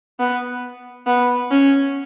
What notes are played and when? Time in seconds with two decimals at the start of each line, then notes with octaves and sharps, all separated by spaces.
0.19 B3
1.07 B3
1.51 C#4